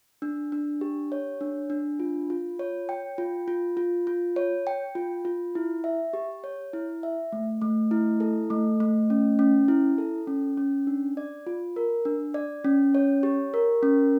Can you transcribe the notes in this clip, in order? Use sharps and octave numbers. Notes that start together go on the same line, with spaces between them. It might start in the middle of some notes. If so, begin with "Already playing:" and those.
D4
D4
G4
C#5
D4
D4
F4
F4
C#5
G5
F4
F4
F4
F4
C#5
G5
F4
F4
E4
E5
G4
C#5
E4
E5
A3
A3
E4
A4
A3
A3
C#4
C#4
E4
A4
C#4
C#4
D4
D5
F4
A#4
D4
D5
C#4
C#5
G4
A#4
C#4